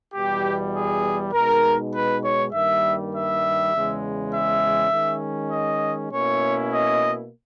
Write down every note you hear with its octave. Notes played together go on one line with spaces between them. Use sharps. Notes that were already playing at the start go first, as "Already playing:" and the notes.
E2 B2 G3 G4
G#4
B2 G#3 D#4 A#4
B4
C#5
G2 D#3 G3 A#3 E5
E5
E2 C#3 G#3
E5
D#3 G#3 C#4
D#5
B2 A#3 C#4 E4 C#5
D#5